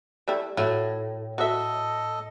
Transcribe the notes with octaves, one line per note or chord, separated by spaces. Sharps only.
G3 A3 E4
A2 F#3 E4 F4
F#4 A4 D#5 E5